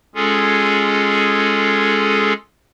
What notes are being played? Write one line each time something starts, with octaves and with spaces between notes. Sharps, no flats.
G#3 C#4 F4 G#4 A4